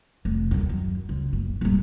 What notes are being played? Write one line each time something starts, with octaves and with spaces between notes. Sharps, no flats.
F1
D#2 D3
F#2
C#2
F#1
D#1 G#2